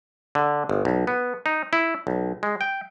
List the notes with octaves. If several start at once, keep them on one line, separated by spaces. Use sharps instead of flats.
D3
G1
B1
B3
D#4
E4
B1
G#3
G5